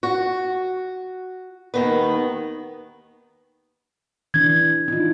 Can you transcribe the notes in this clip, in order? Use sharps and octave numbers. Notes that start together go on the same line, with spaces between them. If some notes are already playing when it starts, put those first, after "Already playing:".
F#4
D#2 D#3 B3
E3 D4 G#6
D#4 F4